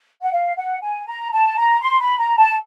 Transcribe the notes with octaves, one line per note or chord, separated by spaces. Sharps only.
F#5
F5
F#5
G#5
A#5
A5
A#5
C6
B5
A#5
A5